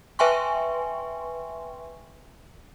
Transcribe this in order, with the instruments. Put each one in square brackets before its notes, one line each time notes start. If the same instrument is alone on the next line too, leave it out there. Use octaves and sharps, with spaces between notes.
[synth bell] B4 E5 G5 G#5 C6 C#6